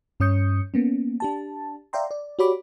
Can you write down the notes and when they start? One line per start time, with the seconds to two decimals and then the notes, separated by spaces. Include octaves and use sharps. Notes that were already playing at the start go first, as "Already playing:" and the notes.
0.20 G2 C#4 C#5 D#6 G6 C#7
0.74 A#3 B3 C#4
1.20 D4 G4 A5
1.93 D5 E5 F5 G5 A#5 C6
2.11 D5
2.39 F#4 G4 C#5 D5 B5 D6